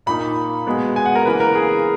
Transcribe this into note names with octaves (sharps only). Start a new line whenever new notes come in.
A#2 A#3 D#4 B5
B2 G#3 B3
G#5
F#5
A#4
C#3 E3 A#3 B4
A#4
G#4